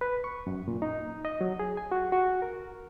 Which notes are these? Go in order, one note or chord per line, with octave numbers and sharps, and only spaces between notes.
B4
C#6
F#2
A#2
D#4
D#5
F#3
G#4
G#5
F#4
F#4
A#4